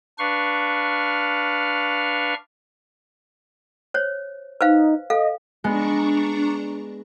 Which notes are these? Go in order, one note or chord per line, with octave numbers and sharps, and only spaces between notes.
D4 B4 F5 C#6 F6
C5 C#5
D#4 B4 C5 F5
A4 D#5 F5
G#3 B3 D4 A#5 C#6